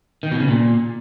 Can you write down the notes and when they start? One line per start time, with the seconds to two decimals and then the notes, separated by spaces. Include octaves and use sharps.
0.23 D#3
0.32 B2
0.40 C#3
0.48 A#2